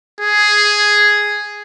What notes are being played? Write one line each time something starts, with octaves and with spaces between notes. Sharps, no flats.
G#4